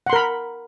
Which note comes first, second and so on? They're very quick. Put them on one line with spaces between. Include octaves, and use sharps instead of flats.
F#5 C6 A#4 B5